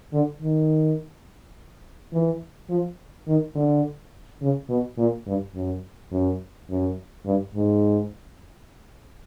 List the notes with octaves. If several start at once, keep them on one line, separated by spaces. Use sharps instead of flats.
D3
D#3
E3
F3
D#3
D3
C#3
B2
A#2
G2
F#2
F#2
F#2
G2
G#2